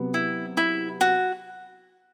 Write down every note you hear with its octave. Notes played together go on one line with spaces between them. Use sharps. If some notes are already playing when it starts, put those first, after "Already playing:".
Already playing: C3 F#3 B3
E4
E4
F#4